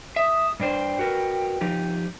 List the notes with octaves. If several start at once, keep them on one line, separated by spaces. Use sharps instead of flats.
E5 D#6
G2 D4 C5 G5
F#4 A#4 B4
F3 D#4 G4